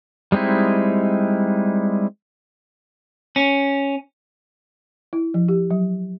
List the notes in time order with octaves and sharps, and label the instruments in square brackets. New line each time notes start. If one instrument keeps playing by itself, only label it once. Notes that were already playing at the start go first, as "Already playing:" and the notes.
[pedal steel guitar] G3 G#3 C4 D#4 E4
[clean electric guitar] C#4
[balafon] E4
F3
G4
F#3